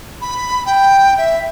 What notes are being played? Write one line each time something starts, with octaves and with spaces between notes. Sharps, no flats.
B5
G5
E5